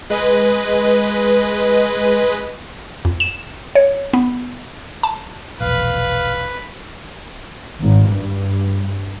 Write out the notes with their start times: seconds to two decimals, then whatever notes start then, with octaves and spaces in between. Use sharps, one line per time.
0.10 G#3 B4 D#5
3.05 F2
3.20 E7
3.75 C#5
4.13 B3
5.03 A5
5.61 E1 A#1 B4 F5
7.81 G#1
8.09 G2